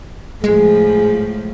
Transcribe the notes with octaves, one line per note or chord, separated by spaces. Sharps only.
A2 F3 G#3 G#4